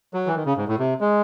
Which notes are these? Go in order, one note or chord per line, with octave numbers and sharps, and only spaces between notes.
F#3
E3
D#3
C#3
G#2
A2
C3
G#3